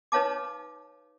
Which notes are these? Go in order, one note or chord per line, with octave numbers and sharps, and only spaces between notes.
D#4 B4 C#5 F5 A5 D6